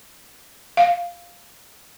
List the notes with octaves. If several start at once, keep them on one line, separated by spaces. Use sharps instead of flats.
F5